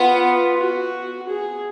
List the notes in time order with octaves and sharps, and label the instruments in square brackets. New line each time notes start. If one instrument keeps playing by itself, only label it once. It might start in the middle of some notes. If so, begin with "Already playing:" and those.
Already playing: [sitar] B3 [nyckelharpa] F4
[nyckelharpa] F#4
G#4